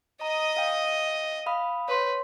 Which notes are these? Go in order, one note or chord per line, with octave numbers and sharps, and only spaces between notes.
D#5 A#5 D#6
F5 G5
F5 B5 D#6
B4 C#5 C6